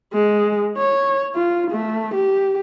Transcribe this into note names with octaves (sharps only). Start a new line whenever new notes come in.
G#3
C#5
F4
A3
G4